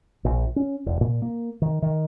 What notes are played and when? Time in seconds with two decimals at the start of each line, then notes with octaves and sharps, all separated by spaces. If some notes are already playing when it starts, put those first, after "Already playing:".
0.25 A#1
0.56 C#4
0.86 E1
1.01 A#2
1.22 A#3
1.62 D#3
1.82 D#3